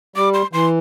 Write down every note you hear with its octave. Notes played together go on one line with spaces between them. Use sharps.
G3 D6
C6
E3 C6